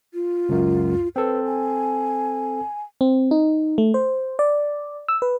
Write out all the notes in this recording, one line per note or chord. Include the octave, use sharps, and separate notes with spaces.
F4
C#2 F#2
C4 A4 B4
G#5
C4
D#4
A3
C5
D5
E6
B4